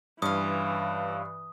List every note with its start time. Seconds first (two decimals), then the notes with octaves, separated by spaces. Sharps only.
0.22 G2 E3 C#4 F4 D#6